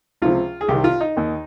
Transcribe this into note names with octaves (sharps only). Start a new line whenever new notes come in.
C#2 C3 F3 F4
G#4
C2 C3 D#3 G4
F4
D#4
D#2 D#3